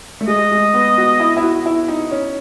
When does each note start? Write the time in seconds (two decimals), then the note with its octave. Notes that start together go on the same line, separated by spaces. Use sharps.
0.21 A3
0.27 G#3 D#5
0.52 G#3
0.74 B3
0.97 F#4
1.20 E4
1.37 E4
1.42 F#4
1.66 E4
1.88 D#4
2.11 C#4